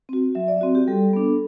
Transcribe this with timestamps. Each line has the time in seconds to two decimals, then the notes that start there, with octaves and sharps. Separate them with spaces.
0.09 C4 F#4
0.35 F#3 E5
0.48 D5
0.61 C4 F#4
0.75 G4
0.88 G3 A4
1.13 B3 D4